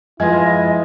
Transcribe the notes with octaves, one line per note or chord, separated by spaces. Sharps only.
F3 G#3 E4 F4 B4 D#5 G#5